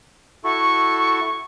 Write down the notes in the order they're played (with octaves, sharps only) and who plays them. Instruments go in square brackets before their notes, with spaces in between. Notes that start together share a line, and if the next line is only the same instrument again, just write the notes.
[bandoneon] E4 F#4 A4 [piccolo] C#6